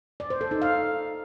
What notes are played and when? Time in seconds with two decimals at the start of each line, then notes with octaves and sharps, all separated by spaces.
0.20 D5
0.30 C5
0.41 A4
0.51 D#4
0.62 F5